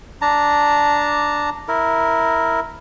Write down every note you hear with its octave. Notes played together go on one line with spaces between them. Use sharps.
D4 A5 A#5
E4 A#4